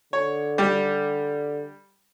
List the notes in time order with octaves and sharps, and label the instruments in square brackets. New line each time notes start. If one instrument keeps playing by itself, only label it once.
[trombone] D3 [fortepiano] C#5
[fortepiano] G3